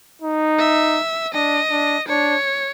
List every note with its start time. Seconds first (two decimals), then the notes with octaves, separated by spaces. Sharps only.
0.22 D#4
0.59 E5
1.34 D4 D#5
1.71 D4
2.09 D4 C#5